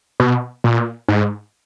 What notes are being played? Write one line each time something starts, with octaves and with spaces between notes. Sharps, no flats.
B2
A#2
G#2